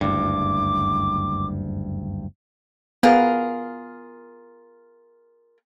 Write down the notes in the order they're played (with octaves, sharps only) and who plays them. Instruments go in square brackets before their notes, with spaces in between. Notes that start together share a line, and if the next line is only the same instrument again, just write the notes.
[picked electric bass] F#1 D2 G2 [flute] D6
[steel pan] B3 [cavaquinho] F4 G#4 A#4